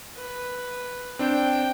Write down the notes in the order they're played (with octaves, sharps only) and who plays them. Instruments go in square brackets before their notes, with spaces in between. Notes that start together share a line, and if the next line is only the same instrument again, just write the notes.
[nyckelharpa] B4
[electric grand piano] C4 D4 [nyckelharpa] G5